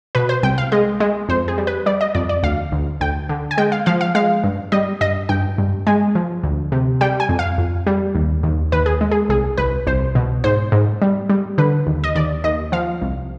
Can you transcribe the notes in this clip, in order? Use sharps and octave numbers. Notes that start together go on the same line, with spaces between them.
B2 B4
C5
C2 G5
F5
G#3 D#5
G#3
F2 C5
G#4
G3
B4
G3 D5
D#5
F2 D5
D5
D2 F5
D2
D2 G5
D3
G#5
G#3 G5
F5
F3 F5
F5
G#3 F5
G2
G3 D#5
G2 D#5
G2 G5
G2
G#3 G#5
F3
D2
C3
G3 G5
G#5
F2
F5
F2
G3
D#2
D#2
D#2 B4
G#4
G#3
G#4
C2 G#4
C2 B4
C2 C5
B2
G#2 C5
G#2
G3
G3
D3 B4
D#2
D#5
D#2 D5
D#2 D#5
F3 F5
C2